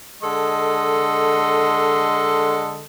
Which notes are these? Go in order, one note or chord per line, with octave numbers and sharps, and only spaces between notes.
D3 G#3 A4 D#5 C6